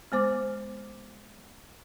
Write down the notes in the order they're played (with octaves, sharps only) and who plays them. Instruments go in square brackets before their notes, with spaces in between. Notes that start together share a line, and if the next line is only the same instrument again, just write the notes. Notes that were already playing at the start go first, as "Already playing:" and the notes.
[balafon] G#3 B3 C5 D6